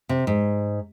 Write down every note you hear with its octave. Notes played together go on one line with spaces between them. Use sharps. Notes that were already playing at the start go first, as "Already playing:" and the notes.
C3
G#2